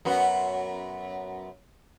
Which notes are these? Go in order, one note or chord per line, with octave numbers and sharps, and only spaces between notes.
F#2 B3 F#4